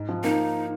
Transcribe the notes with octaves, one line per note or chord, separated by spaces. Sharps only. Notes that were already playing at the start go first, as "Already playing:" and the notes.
Already playing: G#2
F3
A#3 D#4